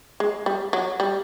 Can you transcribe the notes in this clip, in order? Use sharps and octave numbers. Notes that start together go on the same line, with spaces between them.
G#3
G3
F#3
G3